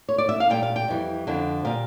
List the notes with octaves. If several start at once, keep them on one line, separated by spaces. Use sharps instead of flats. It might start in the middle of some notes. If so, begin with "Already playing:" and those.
C#5
D5
E5
F5
A#2 G3 G5
F5
G5
F2 E3 G3
F2 D3 F3
A#2 G3 F5